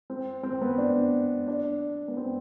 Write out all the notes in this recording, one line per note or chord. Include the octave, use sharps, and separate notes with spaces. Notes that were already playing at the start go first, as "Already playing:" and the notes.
C4
C4
B3
D4
D4
B3
C4